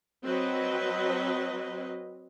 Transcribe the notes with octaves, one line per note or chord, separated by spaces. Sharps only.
F#3 C4 B4 D#5